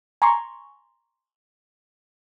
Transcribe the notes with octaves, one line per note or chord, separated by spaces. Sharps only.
G#5 A#5 C6 C#6